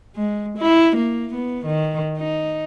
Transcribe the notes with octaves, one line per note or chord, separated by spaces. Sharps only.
G#3
E4
A#3
B3
D#3
D#4